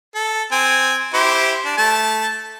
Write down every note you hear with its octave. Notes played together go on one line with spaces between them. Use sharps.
A4
C4 G#5
E4 G4 C5
D4
A3 A5